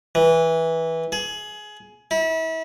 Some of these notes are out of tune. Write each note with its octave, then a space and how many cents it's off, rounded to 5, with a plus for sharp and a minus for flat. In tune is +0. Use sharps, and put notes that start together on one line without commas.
E3 -15
G#4 +20
E4 -35